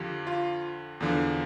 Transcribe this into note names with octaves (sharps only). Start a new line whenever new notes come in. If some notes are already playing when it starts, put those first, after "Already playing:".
Already playing: F2 D3 F3 G4
F4
E2 D3 F3